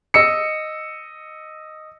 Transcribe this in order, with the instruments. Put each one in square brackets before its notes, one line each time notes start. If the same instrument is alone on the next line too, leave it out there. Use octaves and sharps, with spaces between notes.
[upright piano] D#5 E6 C#7